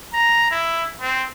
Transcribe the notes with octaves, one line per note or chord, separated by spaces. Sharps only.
A#5
E4
C4